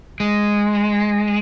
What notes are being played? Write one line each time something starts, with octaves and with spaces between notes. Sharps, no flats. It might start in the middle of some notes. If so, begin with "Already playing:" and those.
G#3